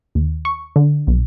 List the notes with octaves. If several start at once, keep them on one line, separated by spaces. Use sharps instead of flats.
D#2
C#6
D3
B1